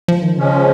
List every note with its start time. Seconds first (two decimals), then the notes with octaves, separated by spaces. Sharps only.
0.08 F3
0.22 D#3
0.37 C#3 F3 G#3 C#4